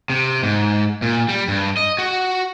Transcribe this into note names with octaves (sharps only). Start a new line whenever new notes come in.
C3
G#2
A#2
G3
G2
D#5
F#4